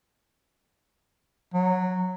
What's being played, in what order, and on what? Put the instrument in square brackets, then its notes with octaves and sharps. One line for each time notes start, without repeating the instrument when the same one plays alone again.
[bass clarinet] F#3